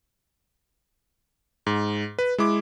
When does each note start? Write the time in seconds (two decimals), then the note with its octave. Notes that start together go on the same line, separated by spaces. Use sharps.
1.67 G#2
2.19 B4
2.38 G#3 E4 D6